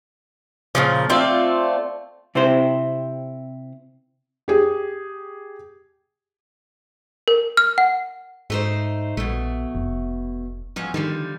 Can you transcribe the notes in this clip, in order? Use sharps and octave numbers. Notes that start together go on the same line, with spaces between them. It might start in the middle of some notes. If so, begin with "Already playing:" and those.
A#2 C#3 F3
A3 C4 F4 D5
C3 C4 E4 C5
G4 G#4
A#4
F6
F#5
G#2 A3 D#4 C5
A#1 B2 A3
F1
E2 F3 C#4
D3 D#3 F3 G3